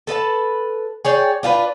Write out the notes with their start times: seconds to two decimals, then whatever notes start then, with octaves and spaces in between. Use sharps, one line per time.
0.07 A4 B4 D#5 A5
1.05 G#4 C#5 D5 G5
1.43 D4 F4 G4 B4